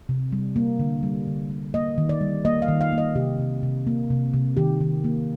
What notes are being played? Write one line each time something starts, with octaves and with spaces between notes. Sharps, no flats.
C3
G3
A#3
D3
G3
D3
A#3
A#3 D#5
D#3
D5
G3
A#3 D#5
F5
D#3
F5
A#3
D#5
C3 G4
C3
C3
A#3
C3
C3
D#3 G4
D#3
A#3